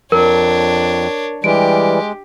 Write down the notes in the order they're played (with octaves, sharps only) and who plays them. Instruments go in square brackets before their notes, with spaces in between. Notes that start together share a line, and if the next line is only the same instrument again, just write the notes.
[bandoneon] F2 [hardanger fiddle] D4 C#5 [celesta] A#4
[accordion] E3 G3 [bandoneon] G#3 [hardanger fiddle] G4 [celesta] D7